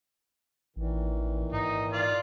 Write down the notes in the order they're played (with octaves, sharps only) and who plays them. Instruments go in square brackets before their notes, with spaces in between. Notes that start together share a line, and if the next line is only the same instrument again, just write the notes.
[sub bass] A1 [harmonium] A#2 D#3 E3
[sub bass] G#2 [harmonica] D#4
[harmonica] F4 D5